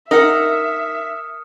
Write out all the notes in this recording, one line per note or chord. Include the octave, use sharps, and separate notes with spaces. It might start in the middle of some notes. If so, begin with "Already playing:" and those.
D#4 A#4 E5 F#5 D#6 F6 C#7